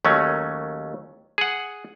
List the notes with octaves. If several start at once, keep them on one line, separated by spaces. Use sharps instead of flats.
D#2 F#3 A3 C#4
G#4 F#5